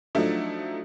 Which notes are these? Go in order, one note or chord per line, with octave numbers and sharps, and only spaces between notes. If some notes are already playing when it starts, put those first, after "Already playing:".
F3 F#3 A3 D4 D#4